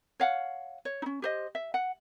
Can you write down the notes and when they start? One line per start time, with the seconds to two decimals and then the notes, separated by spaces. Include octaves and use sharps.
0.20 C#5 F5 F#5
0.85 C#5
1.02 C#4 D#4
1.22 G4 C5 D#5
1.55 E5
1.74 F#5